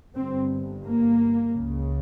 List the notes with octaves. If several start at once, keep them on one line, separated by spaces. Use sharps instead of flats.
G1 G2 C4
A#3
C#2 C#3